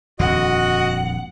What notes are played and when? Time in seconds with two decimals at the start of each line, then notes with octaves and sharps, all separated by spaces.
0.19 D#1 F2 D3 F#4 D#5 F#5